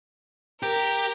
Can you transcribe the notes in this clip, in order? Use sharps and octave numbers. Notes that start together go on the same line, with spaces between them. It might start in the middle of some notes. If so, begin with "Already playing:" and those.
G4 A#4